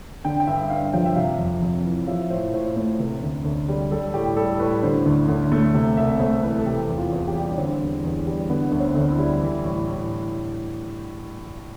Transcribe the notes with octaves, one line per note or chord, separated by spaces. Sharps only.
D3 G5
G5
G2 E5
G2 F5
F3 G5
E5
C3 F5
F2
F2
E3
F3 E5
A2 C5
A2 C5
A3 C5
C3 B4
D2
D2
G3
G3 A4
A2 G4
G3 A4
A2 B4
D3 C5
D2
D2
A3
C3 E5
C2 E5
A3 C5
E3 B4
A4
C3 G4
E2
F4
E2
G4
G3
D4
D3 C4
E2
E2
G3
D3 B3
D2
C4
D2
E4
G3
E3
A2
A2